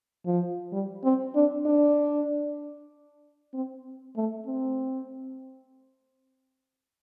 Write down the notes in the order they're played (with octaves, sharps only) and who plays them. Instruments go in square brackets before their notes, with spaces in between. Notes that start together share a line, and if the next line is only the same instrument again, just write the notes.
[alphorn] F3
G3
C4
D4
D4
C4
A3
C4